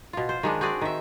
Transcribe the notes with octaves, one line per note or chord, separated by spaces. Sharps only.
B2 F4
C5
D#3 G#3 D4
C4 F#4 G#4 D5
D#3 E5